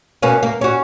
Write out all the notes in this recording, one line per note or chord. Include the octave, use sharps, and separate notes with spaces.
B2 A#3 C#4
A#3
C#4 F#4